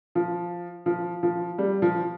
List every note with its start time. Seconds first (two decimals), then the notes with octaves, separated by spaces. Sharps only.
0.15 F3
0.86 F3
1.23 F3
1.58 G3
1.82 F3